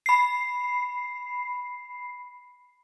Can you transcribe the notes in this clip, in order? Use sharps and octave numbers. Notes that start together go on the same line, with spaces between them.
B5 C7